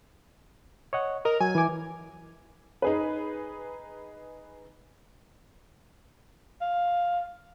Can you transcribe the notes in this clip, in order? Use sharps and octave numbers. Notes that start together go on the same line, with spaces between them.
C#5 D#5 F#5
A#4 D#5
F#3 G#5
E3 D6
D#4 G#4 B4
F5